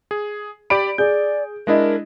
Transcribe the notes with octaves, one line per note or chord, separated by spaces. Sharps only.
G#4
G4 D5 B5 D7
G#4 D5 G6
G#3 D4 E4 A#4 D#5